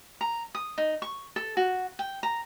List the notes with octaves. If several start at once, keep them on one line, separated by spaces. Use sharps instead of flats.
A#5
D#6
D#4
C#6
A4
F#4
G5
A#5